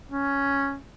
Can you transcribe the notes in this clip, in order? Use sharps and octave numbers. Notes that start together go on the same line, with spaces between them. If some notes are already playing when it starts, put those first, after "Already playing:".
C#4